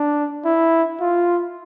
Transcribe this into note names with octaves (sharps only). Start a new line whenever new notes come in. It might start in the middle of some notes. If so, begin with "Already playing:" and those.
Already playing: D4
E4
F4